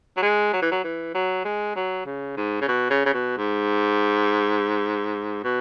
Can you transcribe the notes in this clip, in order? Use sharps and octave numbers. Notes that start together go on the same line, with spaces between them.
F#3
G#3
F#3
E3
F#3
E3
F#3
G#3
F#3
C#3
G#2
C#3
B2
C#3
C#3
B2
G#2
B2